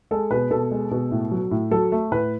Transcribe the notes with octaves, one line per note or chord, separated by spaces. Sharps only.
G#3 A4
B2 B4
B2 A4
G#3
B2
A2
F#3
A2
F#3 A4
A3
A2 B4